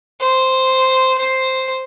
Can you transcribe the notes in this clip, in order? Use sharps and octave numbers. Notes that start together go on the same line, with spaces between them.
C5
C5